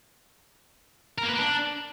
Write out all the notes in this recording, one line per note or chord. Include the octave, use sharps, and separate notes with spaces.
A#4
A#3
B4
A#3
D4